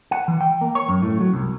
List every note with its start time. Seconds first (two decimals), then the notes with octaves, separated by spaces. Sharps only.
0.11 F#5
0.28 E3
0.41 G5
0.61 A#3
0.75 C#5
0.89 F#2
1.02 A2
1.20 F#3
1.34 C2